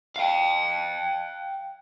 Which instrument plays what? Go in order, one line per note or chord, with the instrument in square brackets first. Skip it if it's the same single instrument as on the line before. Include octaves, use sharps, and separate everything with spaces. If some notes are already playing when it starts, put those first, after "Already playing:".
[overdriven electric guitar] F5 G5